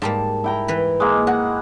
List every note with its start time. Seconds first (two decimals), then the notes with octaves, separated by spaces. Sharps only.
0.02 G#2 G3 A#3 A5
0.44 E4 G5 A#5
0.68 E3 B4
1.00 G#3 A#3
1.27 F#4 F#5